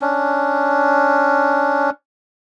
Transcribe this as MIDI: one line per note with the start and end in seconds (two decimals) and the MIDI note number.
0.02 1.90 61
0.02 1.90 62